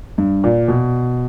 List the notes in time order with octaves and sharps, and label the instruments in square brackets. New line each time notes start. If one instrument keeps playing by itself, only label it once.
[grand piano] G2
A#2
B2